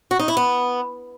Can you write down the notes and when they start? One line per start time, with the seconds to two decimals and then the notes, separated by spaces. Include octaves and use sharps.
0.11 F#4
0.19 D#4
0.28 E4
0.37 B3